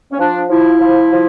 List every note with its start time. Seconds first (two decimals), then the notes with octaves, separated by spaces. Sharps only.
0.12 C#4
0.19 F3 D4
0.50 F3 E4
0.81 F3
1.12 F3